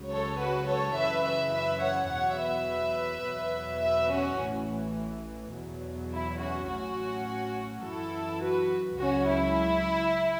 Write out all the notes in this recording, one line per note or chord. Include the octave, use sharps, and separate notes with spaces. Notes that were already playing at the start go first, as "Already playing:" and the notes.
Already playing: C#2 C#3 F#3
A4 C#5
F#4 B4
A4 C#5
F#2 C#3 E3 B4 E5
B4 E5
B4 E5
C#5 F#5
E2 B2 F#3 C#5 F#5
B4 E5
E2 B2 F#3
B4 E5
C#4 F#4
A1 A2 E3
E2 B2 F#3
E4
C#4 F#4
A1 A2 F#3 C#4 F#4
F#2 E3 E4 A4
F#4 B4
C#2 C#3 F#3 C#4 F#4
E4